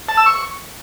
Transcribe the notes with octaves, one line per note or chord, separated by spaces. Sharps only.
A5
E6
C#6